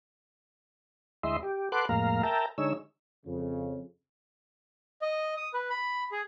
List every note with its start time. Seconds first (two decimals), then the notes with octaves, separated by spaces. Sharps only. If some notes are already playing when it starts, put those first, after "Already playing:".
1.23 D2 G#3 E4 D#5 E5 C6
1.43 G4
1.72 A4 B4 F#5 C6 D6 F#6
1.89 F2 A2 G#3 A#3 F5 A#5
2.23 A#4 E5 G5 A5 A#5
2.58 D3 G#3 D#4 C#5 E6
3.26 F2 C#3
5.02 D#5
5.37 D#6
5.54 B4
5.70 B5
6.12 G#4